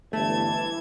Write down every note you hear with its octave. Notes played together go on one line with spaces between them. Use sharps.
G1 E3 A3 A5 G#6